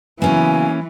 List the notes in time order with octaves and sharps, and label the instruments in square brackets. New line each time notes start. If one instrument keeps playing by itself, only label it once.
[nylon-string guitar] C#3 F#3 B3 [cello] E3 [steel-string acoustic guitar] A#3 C#4 [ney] G#5